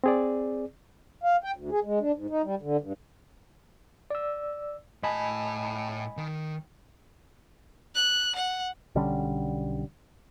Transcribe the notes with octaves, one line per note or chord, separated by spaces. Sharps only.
C4 G#4 D5
F5
G5
D2
G#4
G#3
D4
G#2
D#4
G3
D3
G2
D5 E6
A2 D#5 G#5 A5 B5
D#3
F#6
F#5
B1 D3 G3 C#4